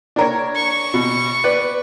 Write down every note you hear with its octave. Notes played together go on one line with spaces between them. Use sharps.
D4 A#4 C#5
C#6
B2
B4 D5